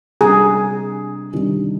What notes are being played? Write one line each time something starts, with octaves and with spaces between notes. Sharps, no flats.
C3 G3 D4 G4 G#4
C3 D#3 G3 D4